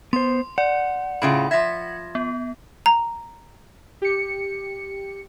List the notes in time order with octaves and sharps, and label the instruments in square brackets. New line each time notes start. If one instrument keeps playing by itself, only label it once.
[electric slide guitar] B3 C5 [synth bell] C6
[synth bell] D5 [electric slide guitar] F#5
[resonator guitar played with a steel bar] A2 C#3 F4 [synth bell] B5
[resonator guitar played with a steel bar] F3 E5 [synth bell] G#6 A#6
[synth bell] B3
[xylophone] A#5
[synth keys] G4 C#7